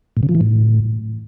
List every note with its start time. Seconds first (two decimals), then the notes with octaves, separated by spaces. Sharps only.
0.17 A2
0.23 C#3
0.29 F3
0.35 E3
0.41 A2